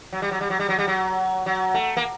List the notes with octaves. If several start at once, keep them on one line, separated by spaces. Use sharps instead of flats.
F#3
G3
F#3
G3
F#3
G3
F#3
G3
F#3
F#3
A3
A#3